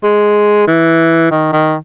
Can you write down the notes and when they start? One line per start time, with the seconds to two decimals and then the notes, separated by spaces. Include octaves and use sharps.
0.03 G#3
0.67 E3
1.31 D#3
1.53 D#3